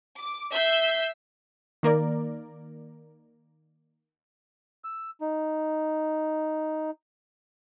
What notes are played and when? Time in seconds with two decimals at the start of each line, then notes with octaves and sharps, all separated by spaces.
0.19 D6
0.53 E5 E6 G6 C7
1.83 D#3 A#3 A#4 D5
4.84 E6
5.21 D#4